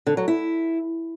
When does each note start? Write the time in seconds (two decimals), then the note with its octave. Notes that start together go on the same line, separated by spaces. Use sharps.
0.07 D3
0.17 F#3
0.28 E4